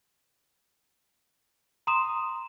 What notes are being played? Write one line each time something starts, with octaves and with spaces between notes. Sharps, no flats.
A#5 C6 D#6 E7